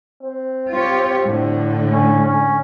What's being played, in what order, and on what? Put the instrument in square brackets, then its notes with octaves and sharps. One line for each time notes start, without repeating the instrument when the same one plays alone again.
[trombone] C4
[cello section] F4 G4 C#5
A2 D3
[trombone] C#4
C#4